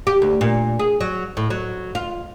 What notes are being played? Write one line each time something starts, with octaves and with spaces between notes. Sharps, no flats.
G4
D2
A#2
G#4
F#3
A2
F#3
F4